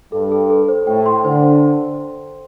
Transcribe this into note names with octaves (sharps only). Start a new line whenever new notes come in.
G2 A4
A4
A4
C5
A2 G5
C6
D3 C5
C5